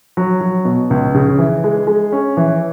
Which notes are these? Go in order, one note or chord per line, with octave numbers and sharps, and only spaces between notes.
F#3
F#3
B2
C#2
C#3
E3
G#3
G#3
C#4
E3